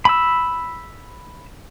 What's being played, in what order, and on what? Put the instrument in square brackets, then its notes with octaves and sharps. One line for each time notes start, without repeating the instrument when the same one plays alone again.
[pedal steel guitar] B5 E6